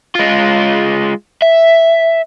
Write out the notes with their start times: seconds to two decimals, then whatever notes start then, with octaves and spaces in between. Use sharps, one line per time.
0.15 G#3 F4
1.42 E5